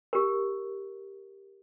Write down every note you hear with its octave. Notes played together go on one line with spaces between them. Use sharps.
G4 A#4